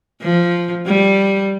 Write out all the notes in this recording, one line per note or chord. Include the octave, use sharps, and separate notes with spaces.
F3
G3